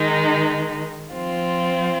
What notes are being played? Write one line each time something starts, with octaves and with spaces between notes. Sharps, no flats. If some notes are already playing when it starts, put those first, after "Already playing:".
Already playing: D#3 G#3 D#4
F3 C4 F4